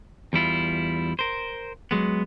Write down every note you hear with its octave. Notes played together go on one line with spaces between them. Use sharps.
E2 G3 E4 F4
A#4 C5
F#3 G#3 B3